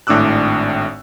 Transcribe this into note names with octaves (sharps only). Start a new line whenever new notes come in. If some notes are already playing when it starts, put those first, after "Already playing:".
G#1 A2 D4 D6 E6 F#6